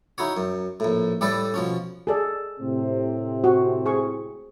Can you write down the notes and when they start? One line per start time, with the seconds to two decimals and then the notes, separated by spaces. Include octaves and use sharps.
0.18 D#4 E4 F#4 C#5
0.37 F#2
0.80 A#1 A2
1.21 A2 G3 G4 A4 B4 D5
1.54 B2 F3 C#4
2.07 G#4 A4 D5
2.59 A2 C3 C4
3.44 F#4
3.86 G#4 C#6